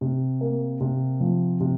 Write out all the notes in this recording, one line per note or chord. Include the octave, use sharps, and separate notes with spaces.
C3
A#3
C3
F3
C3